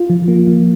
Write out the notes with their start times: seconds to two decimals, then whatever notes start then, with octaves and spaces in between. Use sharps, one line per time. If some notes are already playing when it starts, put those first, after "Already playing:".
Already playing: F4
0.10 F3
0.28 A#3
0.47 F3